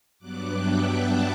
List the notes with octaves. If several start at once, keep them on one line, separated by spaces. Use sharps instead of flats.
G2 F#3 B3 D4 D6 F#6
E5 G5
F#5 A5